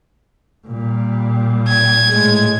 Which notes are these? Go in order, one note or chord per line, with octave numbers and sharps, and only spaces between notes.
A#2 G3
G#6
A2 G#3